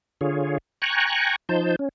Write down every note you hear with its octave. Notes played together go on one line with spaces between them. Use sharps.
D3 F4 G#4 C#5
G5 G#5 A#5 C#6 F#6
F3 D#4 C5 A5 G6
C#4